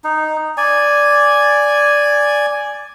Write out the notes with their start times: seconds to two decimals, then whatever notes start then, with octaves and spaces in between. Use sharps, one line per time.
0.04 D#4
0.57 D5 G#5